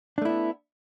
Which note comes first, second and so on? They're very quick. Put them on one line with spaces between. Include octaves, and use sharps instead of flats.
D4 A3 E4 B3